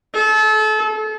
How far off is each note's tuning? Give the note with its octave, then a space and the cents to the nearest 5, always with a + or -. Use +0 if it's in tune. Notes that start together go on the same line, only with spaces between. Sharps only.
A4 -30